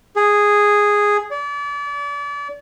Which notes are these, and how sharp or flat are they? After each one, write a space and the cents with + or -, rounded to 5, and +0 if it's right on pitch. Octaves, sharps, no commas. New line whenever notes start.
G#4 -5
D5 -35